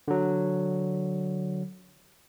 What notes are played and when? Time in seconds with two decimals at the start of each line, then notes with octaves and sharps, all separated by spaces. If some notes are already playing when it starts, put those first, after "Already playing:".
0.08 D3 F#3